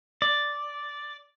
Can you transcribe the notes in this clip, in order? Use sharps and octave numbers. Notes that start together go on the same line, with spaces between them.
D5